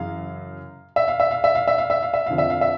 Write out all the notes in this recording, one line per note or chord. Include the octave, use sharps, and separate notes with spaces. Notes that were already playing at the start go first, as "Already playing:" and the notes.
Already playing: F#2 C#3 E3 F5
E5
F5
E5
F5
E5
F5
E5
F5
E5
F5
E5
F2 D3 F3 F5
E5
F5
E5